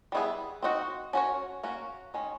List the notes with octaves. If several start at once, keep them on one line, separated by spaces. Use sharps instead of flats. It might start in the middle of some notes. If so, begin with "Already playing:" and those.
G3 B3 E4 G#4
C4 D#4 F#4
C#4 F#4 A#4 C#5
A#3 C#4 F#4
D#3 G#3 C#4